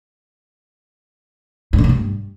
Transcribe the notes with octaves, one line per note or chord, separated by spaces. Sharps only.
G2
D3
C#3
G2